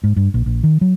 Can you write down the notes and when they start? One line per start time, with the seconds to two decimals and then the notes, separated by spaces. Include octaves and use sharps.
0.04 G#2
0.16 G2
0.34 A#1
0.46 A#1
0.63 D#3
0.81 F#3